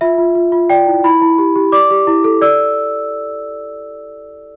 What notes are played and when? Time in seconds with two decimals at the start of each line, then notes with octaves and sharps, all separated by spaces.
0.01 F4 E5
0.18 F4
0.35 F4
0.52 F4
0.70 D5 G5
0.87 E4
1.04 E4 B5
1.21 E4
1.38 G4
1.56 G4
1.72 D5 D6
1.91 G4
2.07 E4
2.24 A4
2.42 D5 E6